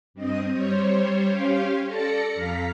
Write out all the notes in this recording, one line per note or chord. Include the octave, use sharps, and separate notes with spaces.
G2 C4 D#5 D#6
G3 C5 C#5
C#4 G4 F5 C6
A4 D5 A5 A#6 C#7
F2 F5 A#5 B6